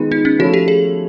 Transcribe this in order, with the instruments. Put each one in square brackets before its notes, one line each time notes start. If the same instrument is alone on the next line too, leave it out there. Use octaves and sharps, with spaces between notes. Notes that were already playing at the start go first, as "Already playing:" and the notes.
Already playing: [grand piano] D#3 G#3 B3 [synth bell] F4
[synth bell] D#4
C#4
[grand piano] F3 A3 C#4 E4 [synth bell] F#4
[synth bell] G4
G#4